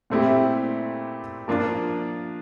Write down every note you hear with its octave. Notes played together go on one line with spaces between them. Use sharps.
A#2 A3 C4 E4 G4
F3 A#3 D4 F4